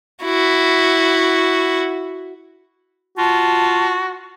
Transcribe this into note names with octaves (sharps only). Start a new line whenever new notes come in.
E4 F#4
F4 F#4 A5